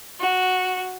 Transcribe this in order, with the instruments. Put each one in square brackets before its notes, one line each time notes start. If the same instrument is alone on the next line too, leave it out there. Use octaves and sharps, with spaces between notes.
[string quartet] F#4